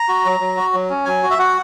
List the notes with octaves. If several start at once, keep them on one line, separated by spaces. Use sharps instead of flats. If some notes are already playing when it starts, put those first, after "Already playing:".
Already playing: A#5
F#4
F#3
F#3
F#4
F#3
C#4
F#3 G#5
F#4
E5
F#4 F#5